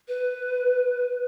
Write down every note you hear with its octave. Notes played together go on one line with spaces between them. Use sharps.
B4